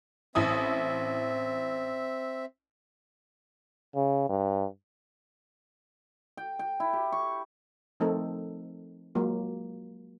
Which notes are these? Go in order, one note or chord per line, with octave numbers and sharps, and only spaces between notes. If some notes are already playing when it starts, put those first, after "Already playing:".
A1 C4 E4 E5 D#6
C#3
G2
G5
G5
E4
G4
C#6
F3 A3 C4 D#4 A4 A#4
F#3 G#3 A#3 F4